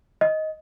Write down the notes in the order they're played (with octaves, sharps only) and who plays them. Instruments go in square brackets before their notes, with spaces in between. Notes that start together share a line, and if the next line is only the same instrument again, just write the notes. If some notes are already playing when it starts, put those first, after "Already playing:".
[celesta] D#5